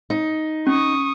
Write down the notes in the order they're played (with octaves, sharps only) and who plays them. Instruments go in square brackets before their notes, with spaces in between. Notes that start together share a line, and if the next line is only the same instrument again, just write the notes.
[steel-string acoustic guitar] D#4
[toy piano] C#4 [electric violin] C#6 D#6